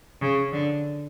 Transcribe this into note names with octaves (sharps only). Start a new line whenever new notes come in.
C#3
D3